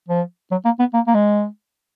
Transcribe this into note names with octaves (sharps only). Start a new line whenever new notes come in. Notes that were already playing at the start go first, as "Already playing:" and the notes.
F3
F#3
A#3
B3
A#3
A#3
G#3